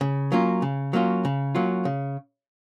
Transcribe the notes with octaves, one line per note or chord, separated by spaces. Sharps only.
C#3
F#3 A#3 C#4 F4
C#3
F#3 A#3 C#4 F4
C#3
F#3 A#3 C#4 F4
C#3